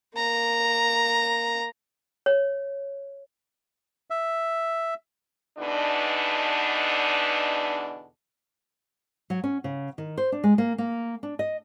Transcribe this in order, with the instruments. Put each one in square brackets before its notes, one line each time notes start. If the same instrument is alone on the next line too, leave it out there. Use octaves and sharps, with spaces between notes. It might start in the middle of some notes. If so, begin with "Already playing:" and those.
[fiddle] A#3 A#5
[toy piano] C#5
[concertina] E5
[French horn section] E2 B2 D3 D4 D#4
[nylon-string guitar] F#3
C#4
C#3
D#3
C5
D4
G#3
A#3
A#3
D4
D#5